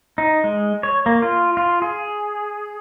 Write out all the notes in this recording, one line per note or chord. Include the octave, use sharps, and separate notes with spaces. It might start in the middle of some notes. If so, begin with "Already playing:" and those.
D#4
G#3
C#5
A#3
F4
F4
G#4